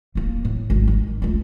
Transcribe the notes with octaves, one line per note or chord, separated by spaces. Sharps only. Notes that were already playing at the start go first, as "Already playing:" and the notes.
D1 A#3
A2
G#1
D#3
C#2 A3